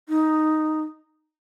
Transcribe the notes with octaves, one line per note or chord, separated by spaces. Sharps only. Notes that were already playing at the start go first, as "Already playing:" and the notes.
D#4